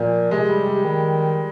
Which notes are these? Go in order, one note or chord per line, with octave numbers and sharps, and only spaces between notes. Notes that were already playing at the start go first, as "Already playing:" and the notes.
Already playing: A#2 F3 A#3
C3 G#3
G3
G3
D#3 G3